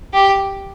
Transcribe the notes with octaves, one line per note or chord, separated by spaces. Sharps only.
G4